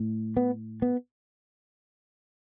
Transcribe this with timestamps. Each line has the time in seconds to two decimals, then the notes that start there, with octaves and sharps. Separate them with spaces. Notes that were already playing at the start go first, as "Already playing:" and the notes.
Already playing: A2
0.37 B3
0.82 B3